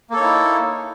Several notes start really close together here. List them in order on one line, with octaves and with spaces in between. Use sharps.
A#3 A4 C#5 D#4 E4